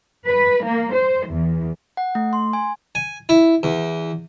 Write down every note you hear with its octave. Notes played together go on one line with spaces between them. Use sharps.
B4
A#3
C5
E2
F#5
A3
C6
G#5
G#5
E4
E2